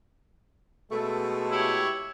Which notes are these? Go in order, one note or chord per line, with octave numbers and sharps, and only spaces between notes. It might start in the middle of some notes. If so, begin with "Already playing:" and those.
B2 G#3 A3 A4
E4 G4 C#5